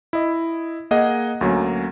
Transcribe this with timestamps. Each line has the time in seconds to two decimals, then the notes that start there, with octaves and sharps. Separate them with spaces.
0.13 E4 D#5
0.91 A#3 G#4 D#5 F#5
1.41 D2 F#3 A#3 C#4